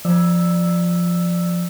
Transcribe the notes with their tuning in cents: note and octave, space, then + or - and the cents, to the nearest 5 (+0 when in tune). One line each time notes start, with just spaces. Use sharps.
F3 +0 D5 +20 E6 +0